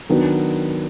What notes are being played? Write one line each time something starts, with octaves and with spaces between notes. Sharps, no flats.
D#3 F#3 B3 D4 F#4